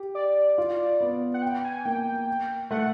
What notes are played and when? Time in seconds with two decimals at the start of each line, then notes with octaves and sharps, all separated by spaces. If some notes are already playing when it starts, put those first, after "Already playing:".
Already playing: G4
0.15 D5
0.58 F4
1.00 B3
1.34 F#5
1.42 G5
1.64 G#5
1.85 A#3 G5
2.71 A3 F#5